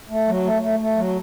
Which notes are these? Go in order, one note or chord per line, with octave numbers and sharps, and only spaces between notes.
A3
F#3
A3
A3
A3
F#3